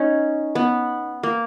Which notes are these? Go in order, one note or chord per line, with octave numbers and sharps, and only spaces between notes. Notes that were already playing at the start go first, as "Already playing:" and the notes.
Already playing: C#4 D#4
B3
A#3